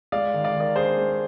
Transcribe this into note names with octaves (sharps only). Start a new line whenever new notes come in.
G#3 D5 F5
D#3
D5 F5
D#3
A#4 D5
D4 G#4 C5
G#3